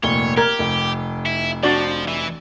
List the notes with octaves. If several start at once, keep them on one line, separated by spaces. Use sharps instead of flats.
F1 A#2 C#5 G7
G4 A#4 G#6
F1
E4
F3 D4 F#4 D5
E3